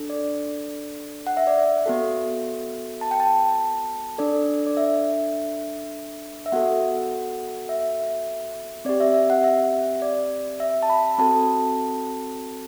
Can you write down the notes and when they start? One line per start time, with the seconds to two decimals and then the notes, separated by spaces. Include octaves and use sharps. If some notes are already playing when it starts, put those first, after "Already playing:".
Already playing: D4 A4
0.10 D5
1.27 F#5
1.37 E5
1.47 D5
1.58 E5
1.86 B3 F#4 A4
3.01 A5
3.11 G5
3.20 A5
4.18 D4 A4 D5
4.67 D5
4.77 E5
6.46 E5
6.52 B3 F#4 A4 F#5
7.69 E5
8.85 C4 G4 D5
9.00 E5
9.14 E5
9.30 F#5
9.44 E5
10.02 D5
10.60 E5
10.83 A5
10.90 B5
11.18 C4 F#4 A4 A5